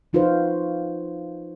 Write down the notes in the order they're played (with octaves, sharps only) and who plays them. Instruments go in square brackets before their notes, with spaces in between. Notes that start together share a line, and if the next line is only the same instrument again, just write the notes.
[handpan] F3 D#4 F4 F#4 B4 C5